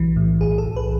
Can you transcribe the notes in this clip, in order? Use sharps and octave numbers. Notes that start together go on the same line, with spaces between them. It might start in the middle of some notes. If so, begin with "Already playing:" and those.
Already playing: B1 E3
A2
B1 G#4
A4
B1
B4